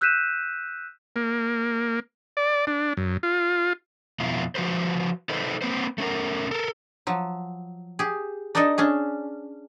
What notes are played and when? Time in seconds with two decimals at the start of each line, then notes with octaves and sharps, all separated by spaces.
0.01 E6 F#6 G6 B6 D#7 E7
1.16 A#3
2.37 D5
2.67 D4
2.97 F#2
3.23 F4
4.20 F2 B2 E4 F4
4.55 F3 F#4 B4 C5
5.29 D#4 A4 B4 C5 D#5
5.62 A#3 C4 B4 C5
5.98 A3 C#4 A#4
6.51 A4 A#4
7.07 F3 F#3
7.99 G4 G#4
8.55 D4 D#4 A4 D5 D#5
8.78 C#4 D4 G#4